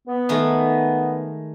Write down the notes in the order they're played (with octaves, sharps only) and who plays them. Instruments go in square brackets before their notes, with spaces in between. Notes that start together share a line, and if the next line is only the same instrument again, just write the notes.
[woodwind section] B3
[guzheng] D#3 G#3 A3